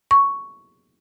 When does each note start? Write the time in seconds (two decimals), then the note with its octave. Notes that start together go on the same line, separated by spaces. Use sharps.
0.11 C#6